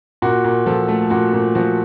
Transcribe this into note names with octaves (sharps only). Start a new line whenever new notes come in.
A#2 F#4
A#2
F3 A4
A3
A#2 F#4
A#2
F3 F#4